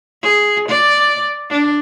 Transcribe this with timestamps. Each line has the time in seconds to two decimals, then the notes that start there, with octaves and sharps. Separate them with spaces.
0.23 G#4
0.69 D5
1.50 D4